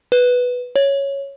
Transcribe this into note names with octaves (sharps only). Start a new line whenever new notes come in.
B4
C#5